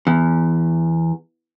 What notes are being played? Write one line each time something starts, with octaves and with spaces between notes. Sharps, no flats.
E2